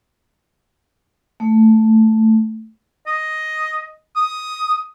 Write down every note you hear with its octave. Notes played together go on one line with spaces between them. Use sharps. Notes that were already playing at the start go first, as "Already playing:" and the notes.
A3
D#5
D#6